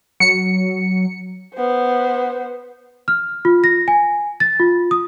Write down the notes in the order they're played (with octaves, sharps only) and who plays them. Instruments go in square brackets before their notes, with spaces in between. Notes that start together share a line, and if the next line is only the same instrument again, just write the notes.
[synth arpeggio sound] F#3 [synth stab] C#7
[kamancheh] B3 C5
[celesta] F6
F4
A#6
G#5
A6
F4
D#6